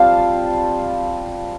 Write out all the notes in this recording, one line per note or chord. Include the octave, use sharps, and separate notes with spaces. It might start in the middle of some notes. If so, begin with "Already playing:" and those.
Already playing: G3 C4 F4 F5 G5 A5